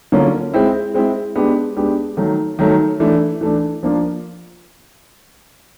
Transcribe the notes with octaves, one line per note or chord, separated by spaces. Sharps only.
D3 F#3 A#3 C#4 F4
G#3 C4 E4
G#3 C4 E4
G#3 B3 D4 G4
G#3 B3 D4 G4
D#3 F#3 A3
D#3 F#3 A3
E3 A3 D4
E3 A3 D4
F3 A#3 D4 F4